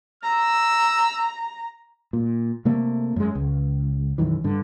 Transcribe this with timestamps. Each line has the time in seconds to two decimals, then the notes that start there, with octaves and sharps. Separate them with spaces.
0.23 A#5 E6
2.13 A#2
2.65 C3 A3 A#3
3.16 F#2 G#3
3.35 C#2
4.18 B1 F#2 D#3 E3
4.44 G2 D3